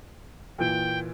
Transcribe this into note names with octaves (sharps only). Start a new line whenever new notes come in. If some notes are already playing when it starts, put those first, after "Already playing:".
A#2 E3 G5 D7